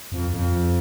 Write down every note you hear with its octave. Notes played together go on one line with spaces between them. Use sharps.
F2
F2